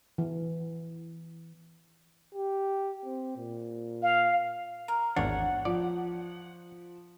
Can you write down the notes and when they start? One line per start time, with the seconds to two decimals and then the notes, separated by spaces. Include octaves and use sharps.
0.18 E3
2.35 G4
3.05 C4
3.37 A#2
4.02 F5
4.88 A#4
5.16 G#1 E2 D4 C#5 F#5
5.65 F3 D5